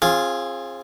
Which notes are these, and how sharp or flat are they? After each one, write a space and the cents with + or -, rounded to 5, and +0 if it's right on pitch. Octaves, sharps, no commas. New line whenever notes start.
C4 +40 F4 +0 G#4 +0